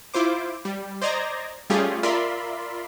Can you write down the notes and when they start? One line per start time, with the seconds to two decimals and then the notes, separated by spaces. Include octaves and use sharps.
0.14 E4 F4 C5 D6
0.65 G3
1.02 C5 D5 D#5 A#5 G#6 A#6
1.70 G3 A3 C#4 F4 G4 G#4
2.03 F4 A#4 D5 E5 B5 C6